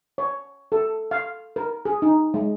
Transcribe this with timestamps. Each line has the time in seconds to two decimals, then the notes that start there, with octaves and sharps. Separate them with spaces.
0.18 C#5
0.72 A4
1.11 F5
1.56 A#4
1.85 G#4
2.02 D#4
2.34 G#3